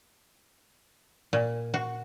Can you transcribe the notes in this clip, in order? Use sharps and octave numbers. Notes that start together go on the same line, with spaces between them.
A#2
F#4